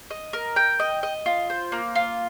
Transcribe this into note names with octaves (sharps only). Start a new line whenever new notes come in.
D#5
A#4
G5
D#5
D#5
F4
C5
A#3
F4